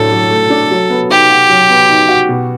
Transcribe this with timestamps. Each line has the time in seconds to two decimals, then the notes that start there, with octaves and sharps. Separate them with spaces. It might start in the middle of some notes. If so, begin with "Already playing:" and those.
Already playing: A2 F#3 A3 D4 A4
0.11 F#3
0.30 A3
0.50 D4
0.71 F#3
0.90 B3
1.10 D#4 G4
1.30 F#4
1.49 F#3
1.70 B3
1.89 D#4
2.09 F#4
2.29 B2